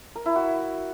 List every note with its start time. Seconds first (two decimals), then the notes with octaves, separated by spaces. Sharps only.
0.16 A#4
0.26 E4
0.36 F#4